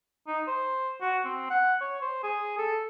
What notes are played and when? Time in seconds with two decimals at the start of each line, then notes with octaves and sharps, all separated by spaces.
0.28 D#4
0.48 C5
1.01 F#4
1.25 C4
1.50 F#5
1.81 C#5
2.02 C5
2.23 G#4
2.58 A4